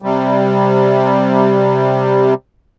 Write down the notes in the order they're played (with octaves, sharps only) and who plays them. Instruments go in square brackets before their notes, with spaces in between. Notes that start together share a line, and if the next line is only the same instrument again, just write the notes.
[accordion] C3 G3